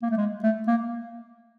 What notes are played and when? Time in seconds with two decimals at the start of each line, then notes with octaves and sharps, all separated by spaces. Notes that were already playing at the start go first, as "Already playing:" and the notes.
0.02 A#3
0.11 A3
0.17 G#3
0.43 A3
0.67 A#3